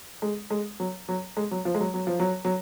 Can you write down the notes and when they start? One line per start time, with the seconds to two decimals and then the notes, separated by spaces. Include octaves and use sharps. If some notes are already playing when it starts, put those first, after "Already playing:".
0.22 G#3
0.50 G#3
0.80 F#3
1.09 F#3
1.37 G#3
1.51 F#3
1.65 F3
1.74 G#3
1.80 F#3
1.94 F#3
2.07 F3
2.20 F#3
2.45 F#3